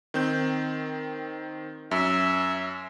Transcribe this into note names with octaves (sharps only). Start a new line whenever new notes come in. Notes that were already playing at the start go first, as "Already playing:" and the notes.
D#3 C4 G6
F#2 E5